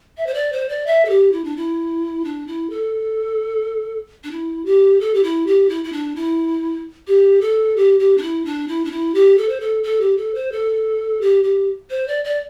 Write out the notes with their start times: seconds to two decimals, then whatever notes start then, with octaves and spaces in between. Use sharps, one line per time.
0.17 E5
0.27 C5
0.34 D5
0.52 C5
0.69 D5
0.86 E5
1.05 A4
1.10 G4
1.32 E4
1.44 D4
1.56 E4
2.25 D4
2.47 E4
2.70 A4
4.24 D4
4.31 E4
4.65 G4
5.00 A4
5.14 G4
5.23 E4
5.47 G4
5.69 E4
5.84 E4
5.92 D4
6.16 E4
7.07 G4
7.41 A4
7.77 G4
7.99 G4
8.18 D4
8.22 E4
8.45 D4
8.68 E4
8.85 D4
8.91 E4
9.14 G4
9.38 A4
9.49 C5
9.60 A4
9.83 A4
10.01 G4
10.17 A4
10.35 C5
10.52 A4
11.21 G4
11.44 G4
11.90 C5
12.08 D5
12.24 D5